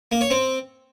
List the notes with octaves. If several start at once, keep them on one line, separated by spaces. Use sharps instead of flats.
A#3
C#5
C4